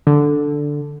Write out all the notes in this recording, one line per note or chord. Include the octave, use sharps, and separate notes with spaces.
D3